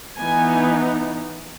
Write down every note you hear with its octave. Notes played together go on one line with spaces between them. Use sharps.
E3 B3 D#4 G#5